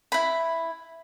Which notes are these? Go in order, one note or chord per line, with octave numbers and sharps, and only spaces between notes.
E4 B5